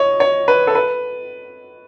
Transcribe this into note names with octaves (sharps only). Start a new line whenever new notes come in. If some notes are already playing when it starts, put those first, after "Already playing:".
Already playing: C#5 D#5
C#5
B4
A4
B4